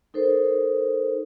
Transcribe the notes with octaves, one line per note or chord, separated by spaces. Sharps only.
D#4 A4 A#4 C5